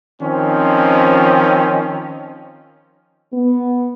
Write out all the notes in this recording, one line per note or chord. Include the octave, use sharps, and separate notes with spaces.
D#3 F3 C4 C#4
B3